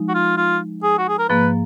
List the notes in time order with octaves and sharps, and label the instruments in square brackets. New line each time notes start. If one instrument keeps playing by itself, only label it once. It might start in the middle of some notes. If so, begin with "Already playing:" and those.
Already playing: [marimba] F3 G#3 D#4
[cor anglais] F#4
F4
F4
G#4
F#4
G#4
A#4
[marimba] G#2 F3 A#3 [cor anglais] B4